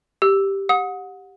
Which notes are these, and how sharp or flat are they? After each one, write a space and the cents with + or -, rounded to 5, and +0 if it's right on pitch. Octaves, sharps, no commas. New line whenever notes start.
G4 +0 E6 +0
F#5 -25 D#6 +25